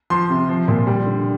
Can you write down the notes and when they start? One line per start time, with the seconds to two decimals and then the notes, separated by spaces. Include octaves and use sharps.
0.10 F3 C6
0.30 C3
0.49 F3
0.68 A#2
0.87 G3
1.06 D3